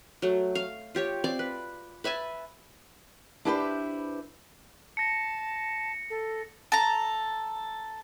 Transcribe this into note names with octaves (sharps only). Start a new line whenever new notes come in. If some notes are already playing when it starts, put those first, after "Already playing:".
F#3 A3
F5
F4 G4 C#5
C4 D5 F5 D6
B4
B4 E5 G#5 A5
D4 E4 G4 G#4 B4 C5
A5 A#6 C#7
A4
A4 A#5